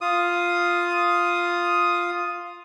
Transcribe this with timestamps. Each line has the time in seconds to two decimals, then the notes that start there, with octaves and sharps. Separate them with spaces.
0.01 F4 D#6